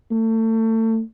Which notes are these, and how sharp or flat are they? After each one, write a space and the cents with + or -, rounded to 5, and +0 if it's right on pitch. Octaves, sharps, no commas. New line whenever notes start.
A3 +30